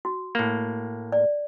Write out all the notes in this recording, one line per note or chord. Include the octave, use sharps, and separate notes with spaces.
F#4
A2 A#3
D5